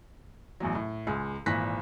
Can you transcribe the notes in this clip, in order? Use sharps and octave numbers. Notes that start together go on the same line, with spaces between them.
A1 E2 F#3
A2
C#2 G#3
G#1 A#2 E3 F#6 A#6 B6